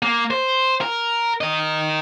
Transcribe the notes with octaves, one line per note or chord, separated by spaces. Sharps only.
A#3
C5
A#4
A#4 D#5